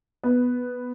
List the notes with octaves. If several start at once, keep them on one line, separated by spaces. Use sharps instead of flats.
B3